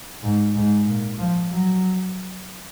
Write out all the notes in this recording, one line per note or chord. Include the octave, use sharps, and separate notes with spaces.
G#2
G#2
A#2
F3
F#3